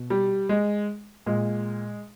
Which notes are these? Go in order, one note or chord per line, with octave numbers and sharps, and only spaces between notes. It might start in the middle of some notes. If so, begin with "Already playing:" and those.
Already playing: B2
G3
G#3
A#2 G#3